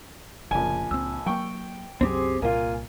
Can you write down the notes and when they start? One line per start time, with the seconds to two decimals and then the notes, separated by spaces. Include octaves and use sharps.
0.51 F1 A#1 C#3 G#5
0.91 C#2 C4 E6
1.26 F#3 A#3 G5 C#6
2.01 C2 F#2 F#3 C4 G4 G#4
2.42 C2 A#2 A#3 F4 G#5